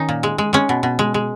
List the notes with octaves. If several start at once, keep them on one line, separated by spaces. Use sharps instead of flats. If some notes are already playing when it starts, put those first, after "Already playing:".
Already playing: D#3 C#4 D#4
A#2
G#3
G#3
G#3 C#4
B2
B2
G#3
G#3